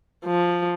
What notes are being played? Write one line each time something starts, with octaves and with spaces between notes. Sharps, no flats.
F3